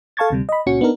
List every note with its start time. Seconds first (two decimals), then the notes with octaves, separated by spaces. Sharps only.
0.17 A4 F5 A5 C#6 G#6 A6
0.30 D2 C3 G3
0.49 D#5 B5
0.66 C#2 A#2 C#4 F#4 C#7
0.81 B3 D4 D#4 A#4